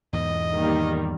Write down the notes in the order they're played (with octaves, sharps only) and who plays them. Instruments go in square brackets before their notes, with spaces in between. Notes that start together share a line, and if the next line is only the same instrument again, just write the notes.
[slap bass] E2 G#2 B2 [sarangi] D#5
[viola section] D#3 G3 A#3